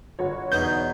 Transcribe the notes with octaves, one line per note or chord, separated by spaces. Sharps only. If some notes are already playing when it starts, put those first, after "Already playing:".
G1 F#4 C#5
E2 B2 D#4 G#4 G6